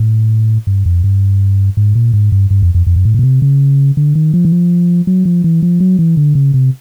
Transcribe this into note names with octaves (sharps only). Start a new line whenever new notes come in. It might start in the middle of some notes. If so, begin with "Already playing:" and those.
Already playing: A2
G2
F2
G2
G#2
A#2
G#2
G2
G2
F2
F2
F2
F#2
A2
A#2
B2
C3
C#3
D3
D#3
F3
E3
F3
F#3
F3
E3
F3
F#3
E3
D3
C#3
C3